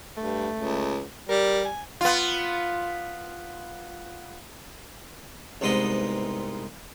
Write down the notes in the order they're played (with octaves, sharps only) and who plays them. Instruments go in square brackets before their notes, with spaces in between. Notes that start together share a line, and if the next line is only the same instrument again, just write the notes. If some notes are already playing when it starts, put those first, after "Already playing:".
[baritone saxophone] G2 [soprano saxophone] A3
[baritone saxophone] C#2
[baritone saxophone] G3 [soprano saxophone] A#4
[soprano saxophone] G#5
[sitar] B3 F4
[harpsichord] C2 G#2 B3 C4 D#4 D#5